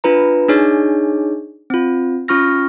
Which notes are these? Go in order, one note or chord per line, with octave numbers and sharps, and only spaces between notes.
D4 F4 B4 A#5
D4 D#4 G#4 C#5
C4 F4
C#4 F4 C#6 F6 A#6